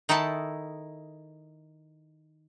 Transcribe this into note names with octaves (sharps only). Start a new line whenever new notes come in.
D#3 D#4 E4 A4 A5